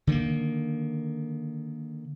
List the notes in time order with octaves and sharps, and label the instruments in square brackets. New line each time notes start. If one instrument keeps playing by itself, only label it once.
[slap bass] D3 D#3 G#3 A#3